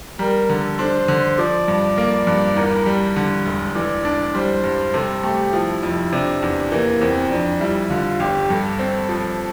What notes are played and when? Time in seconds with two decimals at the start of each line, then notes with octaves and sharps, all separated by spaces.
0.19 G3 A#4
0.49 D3 A4
0.79 D4 C5
1.08 D3
1.38 F3 D5
1.68 G2
1.98 A#3
2.27 G2
2.56 E2 A#4
2.86 G3
3.16 D3
3.46 E1
3.75 E3 D5
4.05 D4
4.35 G3 C5
4.64 G2
4.94 C3 A4
5.23 A3 G4
5.53 F3 E4
5.83 F2
6.12 C3 D4
6.42 E2
6.72 E3 A#3
7.01 E2 C4
7.31 F2 D4
7.61 G3 E4
7.90 D3 F4
8.20 G1 G4
8.50 G2 A4
8.79 C4
9.09 F3